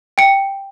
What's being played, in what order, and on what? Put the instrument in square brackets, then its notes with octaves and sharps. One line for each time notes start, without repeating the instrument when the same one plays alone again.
[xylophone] G5 C#7